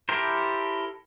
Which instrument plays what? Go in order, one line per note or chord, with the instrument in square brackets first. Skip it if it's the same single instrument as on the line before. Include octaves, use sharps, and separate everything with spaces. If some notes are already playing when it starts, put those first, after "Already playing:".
[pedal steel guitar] E4 G4 A4 A#4 C5